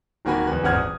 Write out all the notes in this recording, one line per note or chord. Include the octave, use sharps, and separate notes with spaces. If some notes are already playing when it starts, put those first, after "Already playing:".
D1 D#3 A#3 F#4 G#5 B5
E2 B4
D#1 G#1 E2 F#5 F6 G#6
D#6